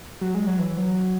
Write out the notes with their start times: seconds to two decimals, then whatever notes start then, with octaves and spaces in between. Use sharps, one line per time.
0.21 F#3
0.35 G#3
0.47 F#3
0.59 E3
0.78 F#3